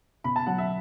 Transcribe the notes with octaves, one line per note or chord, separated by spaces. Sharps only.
B2 B5
A5
F#3 F#5
E5